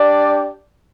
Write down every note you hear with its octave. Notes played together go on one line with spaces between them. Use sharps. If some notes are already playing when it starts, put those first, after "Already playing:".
Already playing: D4 G4 D5